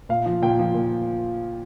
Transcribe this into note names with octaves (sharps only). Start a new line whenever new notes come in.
A#2 F5
F3
A#2 G5
F3
A#2